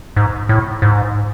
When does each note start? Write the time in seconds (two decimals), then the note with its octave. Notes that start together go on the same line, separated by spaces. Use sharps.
0.16 G#2
0.49 A2
0.82 G#2